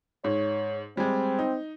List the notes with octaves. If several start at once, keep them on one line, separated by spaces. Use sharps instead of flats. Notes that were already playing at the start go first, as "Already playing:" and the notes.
G#2 C#5
G3 G#3 C4
D#4